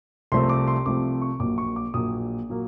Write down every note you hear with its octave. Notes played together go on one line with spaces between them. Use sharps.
C2 C3 F3 A3 C4 C6
D6
C6
C2 C3 F3 A3 C4 D6
C#6
A#1 A#2 F#3 A#3 D6
C#6
D6
A#1 A#2 F#3 A#3 D#6
A#2 F#3 A#3